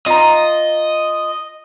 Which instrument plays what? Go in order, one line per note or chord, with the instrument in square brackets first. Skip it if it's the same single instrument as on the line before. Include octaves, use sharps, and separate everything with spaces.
[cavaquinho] F4 A#5 [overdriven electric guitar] D#5